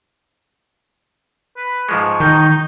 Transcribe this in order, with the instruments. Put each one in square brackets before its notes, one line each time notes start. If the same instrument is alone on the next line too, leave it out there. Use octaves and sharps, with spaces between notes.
[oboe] B4
[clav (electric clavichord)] G#2 F3 G#3 [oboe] C#6
[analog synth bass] D#3 [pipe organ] D#4 G6